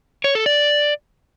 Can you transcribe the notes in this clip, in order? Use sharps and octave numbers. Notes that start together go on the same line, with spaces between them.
C#5
A4
D5